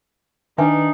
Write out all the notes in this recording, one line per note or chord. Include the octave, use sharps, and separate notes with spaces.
D#3 D4 D#4 B4 E5 G#5